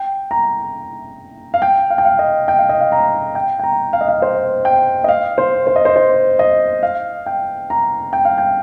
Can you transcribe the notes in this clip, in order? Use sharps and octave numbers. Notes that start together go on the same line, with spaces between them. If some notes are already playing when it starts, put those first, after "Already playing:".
Already playing: G5
A#5
F5
G5
F5
G5
F5
D#5
G5
F5
D#5
F5
A#5
G5
G5
A#5
F5
D#5
F5
C5
G5
D#5
F5
C5
C5
D#5
C5
C5
D#5
F5
G5
A#5
G5
F5
G5